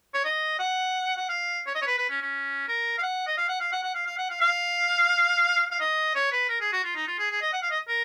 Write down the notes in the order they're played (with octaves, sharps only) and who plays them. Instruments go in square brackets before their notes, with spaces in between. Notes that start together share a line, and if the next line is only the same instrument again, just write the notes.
[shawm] C#5
D#5
F#5
F#5
F5
C#5
D#5
C#5
B4
B4
C#4
C#4
A#4
F5
F#5
D#5
F5
F#5
F5
F#5
F#5
F5
F5
F#5
F5
F5
F5
D#5
C#5
B4
A#4
G#4
F#4
F4
D#4
F4
G#4
G#4
D#5
F#5
F5
D#5
A#4